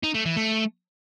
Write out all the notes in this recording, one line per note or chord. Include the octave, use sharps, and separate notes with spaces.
D#4
A3
E3
A3